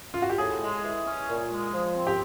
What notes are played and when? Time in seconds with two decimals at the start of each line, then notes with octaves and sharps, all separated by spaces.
0.14 F4
0.22 F#4
0.30 G4
0.38 A2 G#4
0.60 G#3
0.83 E3
1.05 C#4
1.28 A#2
1.50 G#3
1.72 F3
1.95 C4
2.07 G4